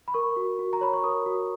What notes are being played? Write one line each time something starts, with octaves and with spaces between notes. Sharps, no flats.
B5
A#4 C#6
F#4
F#4
A#5
C#5 B5
C#6
A#4 D#6
F#4